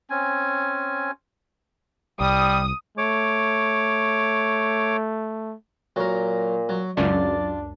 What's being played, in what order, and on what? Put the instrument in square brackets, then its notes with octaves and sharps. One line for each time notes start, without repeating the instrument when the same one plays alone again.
[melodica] C4 C#4 G#5
[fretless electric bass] C2 [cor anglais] G3 [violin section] D#6
[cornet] A3 [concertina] C#5 D6
[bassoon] A#2 [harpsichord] F#3 A#4
[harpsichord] F#3
[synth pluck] C#2 F#2 [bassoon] D4 [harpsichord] F4 [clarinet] D5